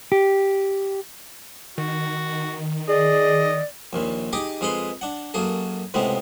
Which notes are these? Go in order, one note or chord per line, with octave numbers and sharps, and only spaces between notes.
G4
D#3 F#4
G#4 D5 D#5
A#1 D#2 A#2
D#4 G4 G#4 D#5 D6
F2 G#3 G#4 B4 B5 C6
D4 F#5
F#2 F#3 A#3 G#4 A4
C#2 A2 C3 G#3 B3 C4